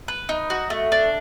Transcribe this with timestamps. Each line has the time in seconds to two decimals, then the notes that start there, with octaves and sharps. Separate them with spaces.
0.08 B4
0.29 D#4
0.50 F#4
0.70 A3
0.92 D4